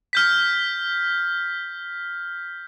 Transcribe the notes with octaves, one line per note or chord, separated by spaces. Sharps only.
F6 G6 B6